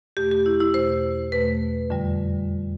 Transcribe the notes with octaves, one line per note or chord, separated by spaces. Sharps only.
E2 B2 A3 G4
G4
E4
E4
E2 B2 A3 C5
E2 B2 A3 B4
F2 D3 G3